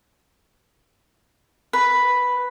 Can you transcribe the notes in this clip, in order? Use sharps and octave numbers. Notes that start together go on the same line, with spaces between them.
B4